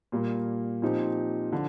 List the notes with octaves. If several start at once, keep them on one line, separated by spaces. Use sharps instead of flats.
A#2 G3 A#3
A#2 F3 C4 D#4 G4
D3 F3